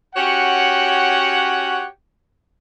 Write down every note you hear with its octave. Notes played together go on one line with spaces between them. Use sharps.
C#4 F#4 G4 C#5 F#5